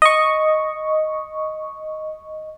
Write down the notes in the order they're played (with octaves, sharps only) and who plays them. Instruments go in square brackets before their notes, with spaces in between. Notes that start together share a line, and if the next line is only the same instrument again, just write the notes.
[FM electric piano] D#5 C#6